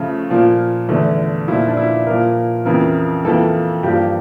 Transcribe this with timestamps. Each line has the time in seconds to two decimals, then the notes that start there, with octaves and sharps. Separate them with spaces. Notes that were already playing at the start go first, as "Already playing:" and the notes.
Already playing: C#3 F3 A3 F4
0.30 A#2 F3 A#3
0.89 E2 D3 A3
1.48 A#2 F3 A#3 E4
1.68 D4
1.77 E4
2.07 A#2 F3 A#3 A#4
2.65 F2 C#3 E3 A#4
3.25 F2 E3 A#3 A4
3.83 G2 F3 A#3 G4